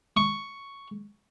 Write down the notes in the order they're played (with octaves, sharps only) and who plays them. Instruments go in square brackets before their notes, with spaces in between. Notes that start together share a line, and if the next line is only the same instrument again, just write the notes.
[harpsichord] C#6